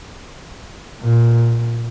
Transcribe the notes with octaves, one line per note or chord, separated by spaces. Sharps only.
A#2